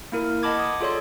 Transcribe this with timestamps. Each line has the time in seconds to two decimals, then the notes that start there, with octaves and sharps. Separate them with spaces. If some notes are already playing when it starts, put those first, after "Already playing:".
0.12 A#3 E4 A#4
0.43 D#5 F#5 A5 B5 D6 G#6
0.59 D#6
0.81 F4 G#4 A4 C#5 D5 C6